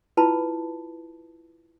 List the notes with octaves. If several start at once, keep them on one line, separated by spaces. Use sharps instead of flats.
E4 F4 B4 A5 B5